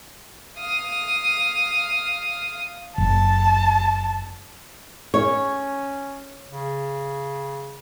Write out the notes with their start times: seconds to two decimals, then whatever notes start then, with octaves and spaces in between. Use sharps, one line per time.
0.58 F5 D#6
2.98 F#1 A5
5.14 C#4 C#5
6.50 C#3